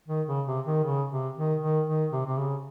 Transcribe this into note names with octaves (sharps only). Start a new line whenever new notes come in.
D#3
C#3
C3
D#3
C#3
C3
D#3
D#3
D#3
C3
C3
C#3